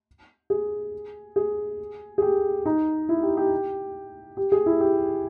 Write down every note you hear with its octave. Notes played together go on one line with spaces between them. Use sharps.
G#4
G#4
G#4
G4
D#4
E4
G4
G4
G4
G#4
E4
G4